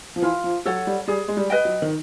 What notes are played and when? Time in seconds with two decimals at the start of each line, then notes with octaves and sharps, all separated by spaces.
0.16 F3
0.22 E3 F4
0.44 F3
0.65 F#3 A4 C#5 F#5
0.87 G3
1.08 G3 G#4
1.28 G#3
1.37 G3
1.50 B4 D#5 G5
1.65 F#3
1.82 D#3